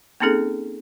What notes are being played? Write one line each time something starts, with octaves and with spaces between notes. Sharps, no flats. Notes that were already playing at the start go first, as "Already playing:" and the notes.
A#3 C4 C#4 D#4 G#4 A4